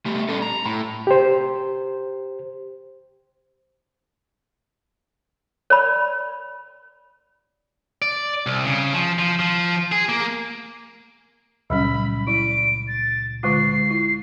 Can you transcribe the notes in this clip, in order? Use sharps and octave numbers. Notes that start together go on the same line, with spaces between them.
G3 A3
C#4 A4
A#5
A2
G4 C5
C#5 D5 B5
D5
C2
C#3
F3
F3
F3
G#4
A#3
C#2 A#2 F#3 G3 C#4 B5
E4 D5 D7
A6
D3 G#3 F4 C7
E4